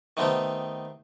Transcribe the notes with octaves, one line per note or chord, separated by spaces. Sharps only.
D#3 A3 B3 C4 G4 G5